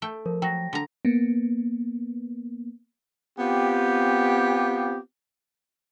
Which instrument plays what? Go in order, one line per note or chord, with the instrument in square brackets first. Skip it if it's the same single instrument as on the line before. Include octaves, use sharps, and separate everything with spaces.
[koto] A3 G5
[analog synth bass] F3 [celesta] A#4
[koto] F#3 [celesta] G5 A#6
[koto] D3 A#5
[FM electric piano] A#3 B3
[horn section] B3 C4 F4 G4